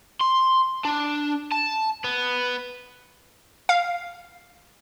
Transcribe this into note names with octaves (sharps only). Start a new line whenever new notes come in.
C6
D4
A5
B3
F5